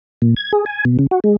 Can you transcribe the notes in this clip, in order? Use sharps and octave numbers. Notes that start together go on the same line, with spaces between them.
A#2
G#6
G#4
G#5
B2
C#3
F#4
G#3